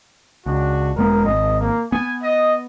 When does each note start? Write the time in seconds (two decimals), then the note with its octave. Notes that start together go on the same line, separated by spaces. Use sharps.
0.46 C#2 D4 F#4
0.96 E1 G#3 B3 A#4
1.25 G#1 D#5
1.60 A#3
1.92 B3 G#5
2.23 D#5